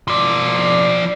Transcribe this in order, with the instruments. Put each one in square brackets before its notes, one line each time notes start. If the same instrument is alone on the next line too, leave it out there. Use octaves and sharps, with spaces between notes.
[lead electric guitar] F3 D5